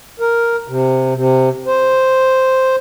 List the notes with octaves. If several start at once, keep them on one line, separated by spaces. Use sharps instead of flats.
A#4
C3
C3
C5